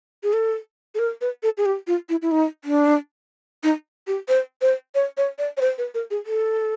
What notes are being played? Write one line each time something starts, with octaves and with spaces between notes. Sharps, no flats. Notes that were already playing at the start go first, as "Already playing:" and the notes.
G#4
A4
A4
A#4
B4
A4
G#4
G4
F4
E4
E4
D#4
D4
D#4
G4
C5
C5
C#5
C#5
D5
C#5
C5
B4
A#4
G#4
A4